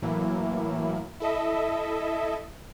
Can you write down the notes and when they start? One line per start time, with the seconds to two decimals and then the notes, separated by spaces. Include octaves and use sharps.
0.02 A2 E3 F#3 A#3 E4
1.20 E4 A4 D#5 E5